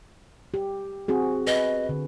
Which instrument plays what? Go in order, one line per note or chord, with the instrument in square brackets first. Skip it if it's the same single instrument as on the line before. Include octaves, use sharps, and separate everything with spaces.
[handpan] G4
C4 F#4 G#4
[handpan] B4 [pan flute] D#5
[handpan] D3